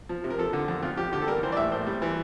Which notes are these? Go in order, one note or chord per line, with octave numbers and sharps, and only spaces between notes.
F3
C3
A#4
F3 A4
D3
F2
F2 F4
F3 G4
D3 G4
A4
G3 A#4
E3 C5
D5
A2 E5
A2 C5
G3
E3